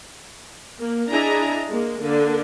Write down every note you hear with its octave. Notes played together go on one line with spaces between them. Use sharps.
A#3
D4 E4 G#4 D#5 G#5 A#5
G#3 A#3
D3 A#3